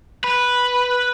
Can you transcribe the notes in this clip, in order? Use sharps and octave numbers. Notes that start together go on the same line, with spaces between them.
B4